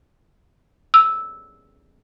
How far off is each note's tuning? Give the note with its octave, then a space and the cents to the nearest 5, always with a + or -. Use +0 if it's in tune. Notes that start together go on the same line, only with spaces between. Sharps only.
E6 -10